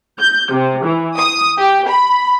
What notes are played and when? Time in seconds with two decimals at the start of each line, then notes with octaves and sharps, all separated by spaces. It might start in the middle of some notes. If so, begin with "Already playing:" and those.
0.20 G6
0.52 C3
0.85 E3
1.17 D#6
1.58 G4
1.88 B5